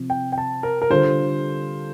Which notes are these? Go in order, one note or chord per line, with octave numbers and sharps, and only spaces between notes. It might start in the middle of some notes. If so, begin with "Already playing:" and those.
Already playing: C3 F3 C4
G5
G5
A5
A#4
A#4
D3 G3 D4 F4 A4 C5